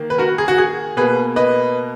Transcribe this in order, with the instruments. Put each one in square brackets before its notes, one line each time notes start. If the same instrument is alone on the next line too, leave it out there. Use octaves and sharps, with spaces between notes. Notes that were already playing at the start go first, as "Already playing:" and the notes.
Already playing: [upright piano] D#3 A#3
B4
F#4 A#4
G#4
F#4
G#4
B2 A#3 G#4 B4
B4 D#5